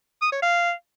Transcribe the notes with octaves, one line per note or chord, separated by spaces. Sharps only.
D#6
C#5
F5